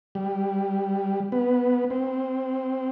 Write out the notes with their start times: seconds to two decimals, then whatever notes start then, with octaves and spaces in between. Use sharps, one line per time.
0.15 G3
1.32 B3
1.90 C4